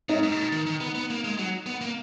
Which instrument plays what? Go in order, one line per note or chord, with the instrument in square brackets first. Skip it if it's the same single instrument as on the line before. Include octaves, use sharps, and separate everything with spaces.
[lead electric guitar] G#2 [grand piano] D#4
[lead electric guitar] G#2
C#3
B2
D#3
D#3
B3
B3
A#3
G#3
F#3
B3
A#3